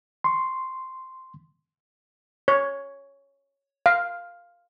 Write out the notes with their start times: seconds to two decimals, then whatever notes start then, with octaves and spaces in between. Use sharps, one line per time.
0.24 C6 C#6
2.48 C#5
3.86 F5